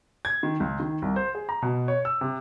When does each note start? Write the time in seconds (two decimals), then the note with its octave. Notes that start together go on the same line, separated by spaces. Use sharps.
0.25 G#6
0.43 D#3
0.60 C#2
0.80 D#3
1.02 C2
1.16 C5
1.35 G#4
1.49 A#5
1.62 B2
1.88 C#5
2.05 E6
2.21 C3